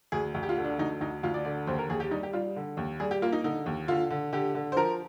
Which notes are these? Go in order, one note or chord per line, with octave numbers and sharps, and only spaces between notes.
D2 G#4
D2
G4
F4
D3
D4
D2 D#4
D2 D#4
D2 F4
D5
D3 D5
D#2 C5
A#4
D#2 G#4
G4
G3 D#4
G4
G3 F4
D3
D#2
G3 G#4
G4
A#3 F4
D#4
D3 D#4
D#2
D3 F4
D3
D3 G4
D3
C5
F3 A#4